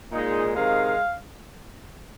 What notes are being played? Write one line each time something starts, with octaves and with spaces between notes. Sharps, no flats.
A#2 G#3 D#4
C3 D#3 G#3 F5